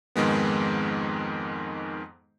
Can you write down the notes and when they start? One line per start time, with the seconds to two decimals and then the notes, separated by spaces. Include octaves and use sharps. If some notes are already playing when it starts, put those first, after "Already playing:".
0.16 F2 G#2 D#3 G#3 B3